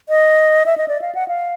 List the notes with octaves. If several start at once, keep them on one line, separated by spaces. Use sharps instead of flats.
D#5
E5
D#5
D5
F5
F#5
F5